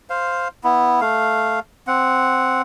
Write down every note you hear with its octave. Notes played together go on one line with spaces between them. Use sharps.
C5 F5
B3 E4
A3 F5
C4 F#5